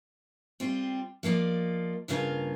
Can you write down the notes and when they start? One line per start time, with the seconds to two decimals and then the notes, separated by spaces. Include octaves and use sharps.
0.60 G3 C4 F4
1.23 F3 A#3 F4 D5 D#5
2.08 G2 C#3 A#3 F4 F5 A#5